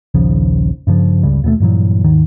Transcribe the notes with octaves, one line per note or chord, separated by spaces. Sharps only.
A#1 D#2 C#3 F3
G2 C#3 F3
G1 C#2 C#3 G3
D#2 B2 F#3 A3
G2 A#2 E3 F#3
D#2 G#2 D#3